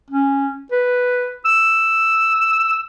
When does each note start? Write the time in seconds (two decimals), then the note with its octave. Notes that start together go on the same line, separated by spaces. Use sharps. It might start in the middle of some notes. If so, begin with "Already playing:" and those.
0.11 C#4
0.72 B4
1.45 E6